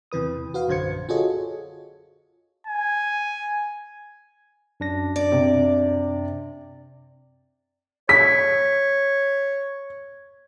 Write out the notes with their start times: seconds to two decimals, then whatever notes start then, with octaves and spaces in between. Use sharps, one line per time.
0.12 E2 C3 E3 B4 D#6
0.54 F#4 B4 F5
0.68 A#1 F#2 D3 C5 G#6 C#7
1.09 F4 F#4 G#4 A4 C#5 D#5
2.67 G#5
4.80 F#2 D4 A#6
5.16 D5
5.32 C3
8.09 C#5 B6